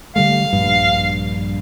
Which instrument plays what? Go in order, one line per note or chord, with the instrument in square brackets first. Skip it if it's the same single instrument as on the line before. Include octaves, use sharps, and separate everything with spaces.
[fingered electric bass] D3 G3 A3 [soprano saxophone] F5
[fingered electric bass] A#1 G2